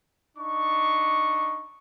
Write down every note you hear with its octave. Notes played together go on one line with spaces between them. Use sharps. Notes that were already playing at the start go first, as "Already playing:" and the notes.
D4 D#4 C#6